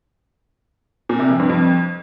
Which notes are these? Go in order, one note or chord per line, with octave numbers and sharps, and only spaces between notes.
A#2
C3
F2
G2
F2